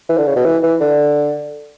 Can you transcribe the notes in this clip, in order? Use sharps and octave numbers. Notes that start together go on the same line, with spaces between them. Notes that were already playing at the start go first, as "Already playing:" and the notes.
E3
D3
C#3
B2
E3
E3
D3